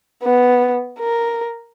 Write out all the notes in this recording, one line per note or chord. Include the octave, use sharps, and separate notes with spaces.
B3
A#4